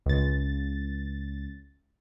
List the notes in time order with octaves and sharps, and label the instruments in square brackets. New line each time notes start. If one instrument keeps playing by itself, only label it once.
[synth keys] C#2 A6